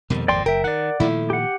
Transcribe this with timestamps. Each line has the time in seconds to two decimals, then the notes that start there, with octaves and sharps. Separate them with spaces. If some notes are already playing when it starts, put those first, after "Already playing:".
0.10 F2 G#2 B2 D#3 G3 A#3
0.28 G#1 A#2 D5 G5 C6
0.46 F#1 A#4 E5 G5
0.64 D#3 D5 F#5
1.00 A#2 D#3 F3 A3 E4
1.30 G4 F#5